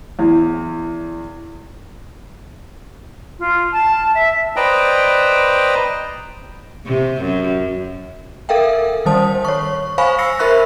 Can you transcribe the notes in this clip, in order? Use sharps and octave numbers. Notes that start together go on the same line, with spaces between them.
E2
F4
A5
E5
B4 C5 D5 D#5 G5 A#5
C3
F#2
A4 A#4 E5 F5 G5
D#3 G3 C5 A5 D#6
C#5 C#6
C5 F5 G#5 B5 C#6
E6 A#6 C7 C#7
A#4 C5 E5 B5 C#6 F#6